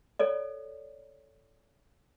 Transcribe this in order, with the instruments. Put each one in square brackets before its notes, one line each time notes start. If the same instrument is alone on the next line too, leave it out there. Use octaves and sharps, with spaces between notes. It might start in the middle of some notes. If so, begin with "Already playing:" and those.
[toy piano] A4 C#5 D5